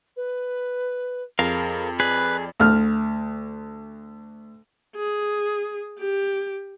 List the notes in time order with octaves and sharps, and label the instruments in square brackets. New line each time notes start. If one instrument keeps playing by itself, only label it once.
[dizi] B4
[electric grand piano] F2 [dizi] G#4 [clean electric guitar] A#4 F5
[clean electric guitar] G#4 [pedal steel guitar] B4 [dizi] D5
[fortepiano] D2 F6
[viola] G#4
G4